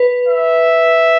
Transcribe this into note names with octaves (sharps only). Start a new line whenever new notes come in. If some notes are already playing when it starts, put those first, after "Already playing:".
Already playing: B4
E5